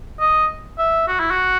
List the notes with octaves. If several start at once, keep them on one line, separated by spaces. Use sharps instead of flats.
D#5
E5
F#4
E4
F#4